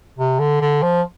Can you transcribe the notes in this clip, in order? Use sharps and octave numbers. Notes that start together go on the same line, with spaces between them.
C3
D3
D3
F3